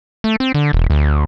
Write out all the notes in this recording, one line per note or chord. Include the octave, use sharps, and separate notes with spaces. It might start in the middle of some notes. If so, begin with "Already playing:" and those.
A3
C4
D3
E1
D2